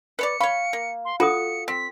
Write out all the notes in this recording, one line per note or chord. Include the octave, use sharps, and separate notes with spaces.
B4 C#5 D5 C#7
C#5 F5 B5 C#6
A#3
C6
F4 F#4 A4 D#6 C#7
C4 B6